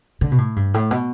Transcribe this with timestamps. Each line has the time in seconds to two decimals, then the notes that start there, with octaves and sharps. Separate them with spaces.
0.21 D3
0.32 B2
0.38 A2
0.56 G2
0.74 A2
0.91 B2